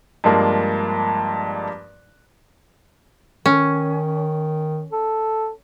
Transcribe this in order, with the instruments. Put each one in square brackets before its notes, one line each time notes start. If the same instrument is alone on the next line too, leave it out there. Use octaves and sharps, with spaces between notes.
[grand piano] G2 F3 G#3 A#3 D4
[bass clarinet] D#3 [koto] C#4
[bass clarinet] A4